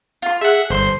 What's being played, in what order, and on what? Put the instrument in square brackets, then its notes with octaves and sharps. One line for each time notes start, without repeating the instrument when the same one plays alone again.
[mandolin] F4 C6
[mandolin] G#4 [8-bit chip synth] E5 F#5
[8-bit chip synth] G1 C6 [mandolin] C5